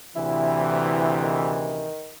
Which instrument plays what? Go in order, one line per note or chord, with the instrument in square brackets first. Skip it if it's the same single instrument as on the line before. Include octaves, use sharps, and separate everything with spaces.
[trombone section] D2 C3 E3 [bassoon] E4
[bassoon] D#3